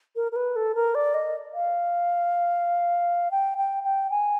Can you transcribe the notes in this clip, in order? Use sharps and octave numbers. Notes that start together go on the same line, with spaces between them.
A#4
A#4
B4
A4
A#4
D5
D#5
F5
G5
G5
G5
G#5